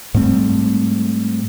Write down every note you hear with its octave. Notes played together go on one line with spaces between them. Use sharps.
G#2 G3 A3 C4